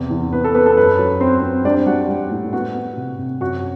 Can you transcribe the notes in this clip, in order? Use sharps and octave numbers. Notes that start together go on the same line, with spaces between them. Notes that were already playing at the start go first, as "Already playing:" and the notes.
Already playing: E2 C3
E2
B3 B4
A4
B3 B4
A4
F#2 B4
F#3
C4 C5
C4
G3 D4 D5
G3 F#4 F#5
G3
A2
B3 F#4 F#5
B3
C3
C3
F#2 F#4 F#5